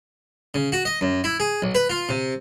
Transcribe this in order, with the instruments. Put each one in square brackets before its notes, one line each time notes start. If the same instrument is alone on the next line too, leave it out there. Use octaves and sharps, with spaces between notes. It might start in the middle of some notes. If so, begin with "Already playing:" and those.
[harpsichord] C#3
F#4
D#5
F#2
E4
G#4
B1
B4
F4
C3